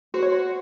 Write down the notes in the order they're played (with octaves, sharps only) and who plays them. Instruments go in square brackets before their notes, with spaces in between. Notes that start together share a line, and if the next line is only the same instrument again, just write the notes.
[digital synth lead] F#4 [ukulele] C5
[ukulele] C#5
C5